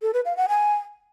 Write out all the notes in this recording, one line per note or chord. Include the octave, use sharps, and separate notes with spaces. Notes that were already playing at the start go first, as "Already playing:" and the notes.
A4
B4
F5
F#5
G#5